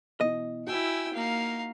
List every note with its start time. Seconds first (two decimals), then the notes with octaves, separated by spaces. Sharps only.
0.21 B2 E3 D#5
0.67 E4 F#4 G5 G#5 E6
1.14 A#3 D#4 F5